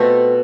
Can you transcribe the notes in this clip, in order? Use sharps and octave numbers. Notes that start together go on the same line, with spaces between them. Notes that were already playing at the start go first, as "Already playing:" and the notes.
Already playing: B2 A3 C4 F4 A4